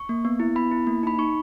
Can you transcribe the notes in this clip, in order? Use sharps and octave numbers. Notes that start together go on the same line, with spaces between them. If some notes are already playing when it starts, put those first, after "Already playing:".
Already playing: C#6
A#3
B3
E4
B3 B5
E4
A#3
D#4 B5
D#4 C#6